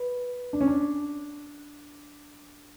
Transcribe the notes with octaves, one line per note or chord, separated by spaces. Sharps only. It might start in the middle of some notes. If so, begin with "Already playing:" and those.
Already playing: B4
D4
C#4
D4